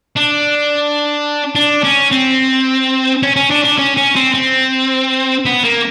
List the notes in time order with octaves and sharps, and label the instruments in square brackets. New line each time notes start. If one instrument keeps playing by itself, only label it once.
[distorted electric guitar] D4
D4
C#4
C4
C#4
C#4
D4
D4
C#4
C#4
C4
C4
B3
A#3